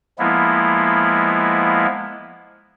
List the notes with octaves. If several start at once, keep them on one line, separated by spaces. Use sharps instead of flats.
F3 G#3 A#3 B3 E4